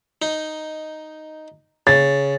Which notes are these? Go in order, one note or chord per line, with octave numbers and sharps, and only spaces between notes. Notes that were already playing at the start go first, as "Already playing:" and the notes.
D#4
C#3 A6